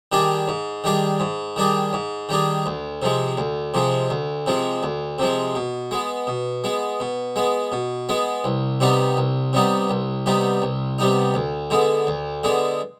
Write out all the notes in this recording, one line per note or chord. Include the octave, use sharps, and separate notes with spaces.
D#3 G3 D4 G#4
G#2
D#3 G3 D4 G#4
G#2
D#3 G3 D4 G#4
G#2
D#3 G3 D4 G#4
D2
C3 F3 G#3
D2
C3 F3 G#3
D2
C3 F3 G#3
D2
C3 F3 G#3
B2
G#3 B3
B2
G#3 B3
B2
G#3 B3
B2
G#3 B3
C2
C3 G3 B3 D#4
C2
C3 G3 B3 D#4
C2
C3 G3 B3 D#4
C2
C3 G3 B3 D#4
D2
D3 G#3 B3
D2
D3 G#3 B3